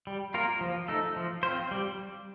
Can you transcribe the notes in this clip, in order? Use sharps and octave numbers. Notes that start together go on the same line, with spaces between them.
G3
A#3 F4 A#4
F3
A3 D#4 A4
F3
C4 F4 C5
G3